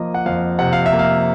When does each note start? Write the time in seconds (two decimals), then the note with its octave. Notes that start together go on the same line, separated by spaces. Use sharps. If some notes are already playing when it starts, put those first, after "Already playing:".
Already playing: F3 A#3 D#5
0.14 F#5
0.26 F2 F5
0.59 C3 F#5
0.73 F5
0.86 E5
0.93 A#3
0.99 F5